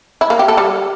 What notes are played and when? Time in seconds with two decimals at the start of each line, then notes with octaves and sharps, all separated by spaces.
0.21 E4
0.30 A#3
0.39 G4
0.48 A4
0.57 G3